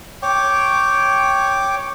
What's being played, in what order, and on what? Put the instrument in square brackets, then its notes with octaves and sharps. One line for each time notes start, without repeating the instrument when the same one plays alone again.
[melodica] C#5 G5 D6